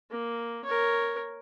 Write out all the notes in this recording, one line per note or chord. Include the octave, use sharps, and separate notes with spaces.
A#3
A#4 C#5